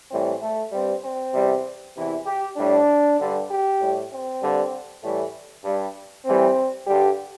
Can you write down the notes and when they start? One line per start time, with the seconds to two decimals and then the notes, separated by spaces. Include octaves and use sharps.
0.11 A2 E3 G3 C4
0.42 A3
0.72 G2 G3 C4
1.03 C4
1.34 E2 C3 G3
1.95 E2 C3 E3 E4
2.26 G4
2.57 A2 G3 D4
3.19 G2 D3 G3
3.49 G4
3.80 A2 G3
4.11 C4
4.41 G2 D3 G3
5.02 A2 E3 G3 A3
5.64 G2 G3
6.26 A2 E3 G3 C4
6.87 G2 D3 G3 G4